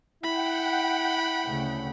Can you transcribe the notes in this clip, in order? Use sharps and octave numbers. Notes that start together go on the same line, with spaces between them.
E4 F#5 G5 B5
D2 C#3 A3